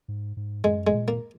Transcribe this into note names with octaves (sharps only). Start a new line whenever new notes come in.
G#2
G#2
F#2 G#3
G#3
A#2
A#3